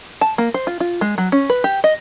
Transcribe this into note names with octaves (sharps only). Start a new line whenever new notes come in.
A5
A#3
C5
F4
F4
G#3
F#3
C#4
B4
G4
D#5